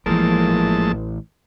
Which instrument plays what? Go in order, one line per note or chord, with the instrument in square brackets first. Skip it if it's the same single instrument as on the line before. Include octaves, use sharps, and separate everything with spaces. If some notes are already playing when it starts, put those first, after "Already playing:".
[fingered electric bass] A1 E3 [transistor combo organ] A2 G#3 A5 [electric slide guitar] F3 A#3 A#4